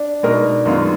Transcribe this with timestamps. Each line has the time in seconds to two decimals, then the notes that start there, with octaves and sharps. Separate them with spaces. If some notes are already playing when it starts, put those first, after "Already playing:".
Already playing: D4
0.23 B2 G#3 D#4 A#4
0.65 F#2 D#3 G#3 B3 F4